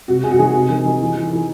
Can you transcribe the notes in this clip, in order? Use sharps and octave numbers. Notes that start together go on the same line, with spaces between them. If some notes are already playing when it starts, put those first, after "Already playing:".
C3 F#4
C3 G#4
F#4
D#3 G#4
C3
D#3
D#3
E3
E3
E3